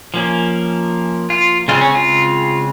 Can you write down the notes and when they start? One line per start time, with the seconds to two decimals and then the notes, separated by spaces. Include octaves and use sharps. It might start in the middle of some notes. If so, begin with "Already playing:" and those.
0.14 F3 A#3 C#4
1.30 F4
1.68 C#3 G#3 C4 F4
1.81 C#4
1.95 F4